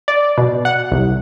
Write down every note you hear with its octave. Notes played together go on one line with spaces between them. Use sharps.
D5
B2
F#5
C2